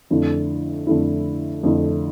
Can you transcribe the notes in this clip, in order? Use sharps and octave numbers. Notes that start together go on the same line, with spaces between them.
F2 D3 A3 E4
F2 D3 A3 E4
F2 D3 A3 E4